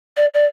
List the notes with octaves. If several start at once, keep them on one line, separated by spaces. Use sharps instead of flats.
D5
D5